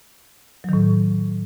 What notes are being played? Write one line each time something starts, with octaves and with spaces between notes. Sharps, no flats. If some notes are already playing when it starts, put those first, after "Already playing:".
A2 D#3 F#3